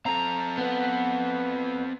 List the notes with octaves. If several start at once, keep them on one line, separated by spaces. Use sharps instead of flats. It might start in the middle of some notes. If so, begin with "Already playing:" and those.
C4 A4 A#5
B3 B4